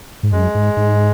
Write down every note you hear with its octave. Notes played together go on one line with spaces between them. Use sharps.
G#2
F#2 G#3
G#2
G#2